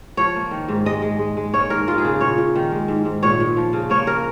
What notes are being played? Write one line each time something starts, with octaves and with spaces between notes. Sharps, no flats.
F3 C#5
A#3
D#3
G#2
G#3 D#5
G#3
G#3
G#3
A#3 C#5
G#2 A#4
G#3 F4
G#4
C#3
A#2 C#5
A#2
D#3
G#3
G#2
G#2
A#2 C#5
A#2
F3
C#3
A#3 C#5
C#3 A#4